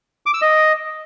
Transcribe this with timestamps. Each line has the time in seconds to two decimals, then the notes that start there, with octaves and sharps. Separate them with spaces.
0.26 D6
0.34 E6
0.42 D#5